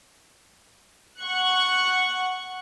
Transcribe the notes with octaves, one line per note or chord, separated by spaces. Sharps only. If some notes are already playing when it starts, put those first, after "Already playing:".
F#5 C#6 F#6